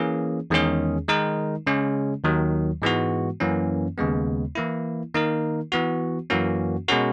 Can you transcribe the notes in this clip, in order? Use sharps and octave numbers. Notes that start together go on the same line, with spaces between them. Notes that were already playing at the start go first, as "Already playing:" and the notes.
Already playing: E3 A#3 C#4 G#4
E2 D#3 G#3 C#4 G#4
D#3 G#3 D#4 A#4
C#3 G#3 C#4
D#2 D#3 F#3
G#2 E3 G#3 B3 F#4
F#2 E3 A#3 C#4
D#2 C#3 G#3 B3
E3 A#3 E4
D#3 A#3 D#4 A#4
E3 B3 F#4
F#2 E3 A#3 C#4 F#4
B2 G#3 C#4 F#4 A#4